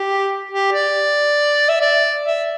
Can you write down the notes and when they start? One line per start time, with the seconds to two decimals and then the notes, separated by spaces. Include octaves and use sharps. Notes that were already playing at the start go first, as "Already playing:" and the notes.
Already playing: G4
0.51 G4
0.72 D5
1.69 E5
1.81 D5
2.26 E5